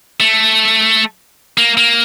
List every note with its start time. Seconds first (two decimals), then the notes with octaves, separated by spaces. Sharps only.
0.20 A3
1.58 A#3
1.77 A#3